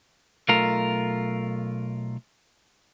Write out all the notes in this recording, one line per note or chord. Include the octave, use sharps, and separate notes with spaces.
B1 A3 F4 A#4